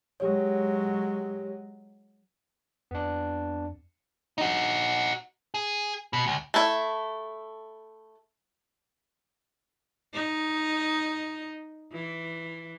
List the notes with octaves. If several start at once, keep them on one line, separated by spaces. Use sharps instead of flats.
F#3 G#3 G4 C#5
F2 B3 D4
D#4 F#4
G#4
B2
C#2
A3 E4
D#4
E3